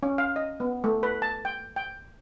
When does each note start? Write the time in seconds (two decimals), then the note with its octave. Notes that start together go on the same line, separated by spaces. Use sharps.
0.03 C#4
0.18 F5
0.36 D#5
0.60 B3
0.84 A3
1.03 B4
1.22 A5
1.45 G5
1.76 G5